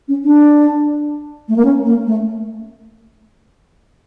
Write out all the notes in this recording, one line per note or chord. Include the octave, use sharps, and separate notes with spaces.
C#4
D4
A3
A#3
C#4
A#3
A3